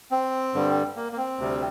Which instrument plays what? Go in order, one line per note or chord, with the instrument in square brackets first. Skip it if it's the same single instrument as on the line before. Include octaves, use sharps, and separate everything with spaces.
[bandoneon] C4
G2 D3 G3
A#3
A#3
C4
D2 C3 G3